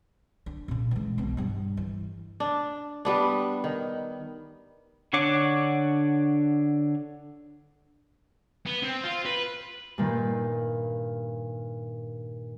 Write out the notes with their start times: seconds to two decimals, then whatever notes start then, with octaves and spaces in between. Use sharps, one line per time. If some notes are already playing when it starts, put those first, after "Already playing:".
0.46 D4
0.68 A#2 C#3
0.91 E3 G#3
1.18 B1 B2
1.37 G2 G3
1.77 E3
2.40 D4
3.05 G3 B3 D4
3.64 D#3
5.13 D3 D4 C#5 F#5 D6
8.66 B3
8.83 C4
9.03 F4
9.25 B4
9.98 G2 A#2 D#3